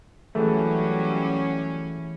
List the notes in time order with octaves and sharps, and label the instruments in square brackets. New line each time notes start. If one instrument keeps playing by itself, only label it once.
[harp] E3 G#4 [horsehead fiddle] F#3 G3 [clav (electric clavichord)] A3 [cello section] C#4